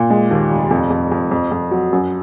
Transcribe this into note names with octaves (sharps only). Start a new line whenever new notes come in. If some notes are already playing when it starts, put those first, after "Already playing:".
Already playing: A#2
G#3
D#2
F1
F2
F2
F2
F2
F2
F#3
F#2